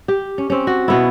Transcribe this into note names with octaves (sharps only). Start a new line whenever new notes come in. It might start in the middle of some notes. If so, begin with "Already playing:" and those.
G4
C#4
C4 C#4
F#4
B2 B3 E4